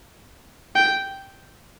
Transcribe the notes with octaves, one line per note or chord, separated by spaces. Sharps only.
G5